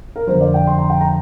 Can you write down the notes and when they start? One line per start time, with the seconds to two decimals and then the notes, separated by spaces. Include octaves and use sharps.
0.16 A#4
0.27 F2 D3 F3 C5
0.41 D5
0.54 G5
0.67 C6
0.78 A#5
0.90 G5
1.01 A#5